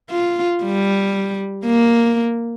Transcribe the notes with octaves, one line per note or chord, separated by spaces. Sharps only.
F4
G3
A#3